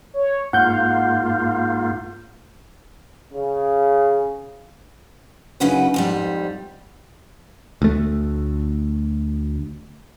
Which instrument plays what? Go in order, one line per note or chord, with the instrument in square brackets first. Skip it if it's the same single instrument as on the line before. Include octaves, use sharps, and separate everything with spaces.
[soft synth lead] C#5
[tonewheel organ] G#2 A#3 F4 [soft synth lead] F5 [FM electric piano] F#5 G6
[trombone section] C#3
[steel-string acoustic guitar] F#2 C#3 C#4 D#4 F#4 B4
F2 G#2 G3
[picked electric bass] D2 A3